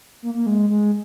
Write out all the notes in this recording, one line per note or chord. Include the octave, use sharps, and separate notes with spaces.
A#3
A#3
G#3
G#3